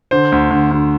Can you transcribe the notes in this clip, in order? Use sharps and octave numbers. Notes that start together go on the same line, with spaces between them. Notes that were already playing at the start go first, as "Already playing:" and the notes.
D3 C5
D2
D2
D2